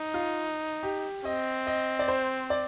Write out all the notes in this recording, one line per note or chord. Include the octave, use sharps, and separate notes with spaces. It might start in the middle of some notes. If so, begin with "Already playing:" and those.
Already playing: D#4
F4
G4
C4 D#5
D#5
D5
C5
D5